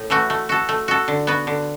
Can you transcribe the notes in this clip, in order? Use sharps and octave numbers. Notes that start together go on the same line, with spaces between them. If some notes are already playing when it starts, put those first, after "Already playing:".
Already playing: A2
E3 A3 F#4
A3
F#4 A4
A3
F#4 A4
D3
B3 F#4 B4
D3